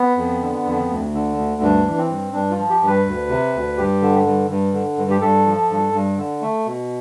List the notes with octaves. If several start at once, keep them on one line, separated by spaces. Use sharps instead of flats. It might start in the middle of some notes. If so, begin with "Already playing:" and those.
Already playing: B3
F2
D3
F2
D2
D3
D2
G2 D4
E3
C4
G2
G2 D4
F4
F3
G4
G2
B4
D2
C3
D2
G2 G4
D3
G2
G2
D3
G2
G4
G2 A4
F3
G2
G2
D3
A3
B2